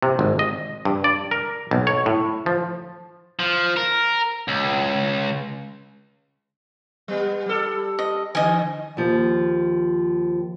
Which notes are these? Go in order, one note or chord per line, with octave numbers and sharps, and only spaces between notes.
C3
G#1
D#5
G2
D5
A#4
B1
C#5
A2
F3
F3
A#4
C#2
G3 B3
G3 A4
D#5
D3 D#5 G#5
D#2 F3